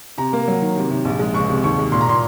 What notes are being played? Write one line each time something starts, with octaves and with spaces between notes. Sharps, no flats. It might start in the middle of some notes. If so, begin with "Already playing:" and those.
C3 A#5
A#3
F#3
D#3
C3
C3
A#1
G#3
C#2 C#6
C3
D#2 C#6
G#3
A#2 C6
A#5
A#2 C6